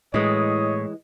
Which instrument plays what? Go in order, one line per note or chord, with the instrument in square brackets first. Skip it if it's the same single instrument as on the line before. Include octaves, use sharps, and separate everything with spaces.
[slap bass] A2 [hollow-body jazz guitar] E3 G#3 [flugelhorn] C#5 [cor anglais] D#5